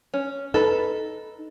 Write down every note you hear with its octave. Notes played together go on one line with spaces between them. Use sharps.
C#4
D#4 A4 B4